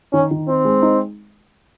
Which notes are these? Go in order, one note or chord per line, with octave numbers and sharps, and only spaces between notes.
D#3 C#4
D#3
C4 D#4
G#3
D#4